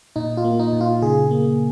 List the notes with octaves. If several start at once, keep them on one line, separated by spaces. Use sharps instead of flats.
A#2 D#4
F4
A#3
D#4
A#2
F4
C#3 G#4
A#3